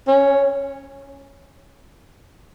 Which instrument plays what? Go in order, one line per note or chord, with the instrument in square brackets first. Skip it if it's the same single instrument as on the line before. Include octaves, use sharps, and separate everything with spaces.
[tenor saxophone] C#4